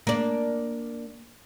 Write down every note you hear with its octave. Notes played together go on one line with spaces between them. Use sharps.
A#3 D4